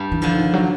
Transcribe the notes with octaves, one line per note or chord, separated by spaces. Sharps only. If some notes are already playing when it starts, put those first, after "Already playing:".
Already playing: G2
E3
D3 F3
D#3
F#3